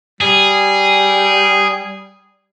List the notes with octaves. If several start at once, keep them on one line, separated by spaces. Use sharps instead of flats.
G3 G#4